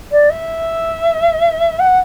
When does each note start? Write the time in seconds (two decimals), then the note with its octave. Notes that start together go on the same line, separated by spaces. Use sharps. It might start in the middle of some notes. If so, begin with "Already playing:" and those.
0.11 D5
0.30 E5
1.79 F#5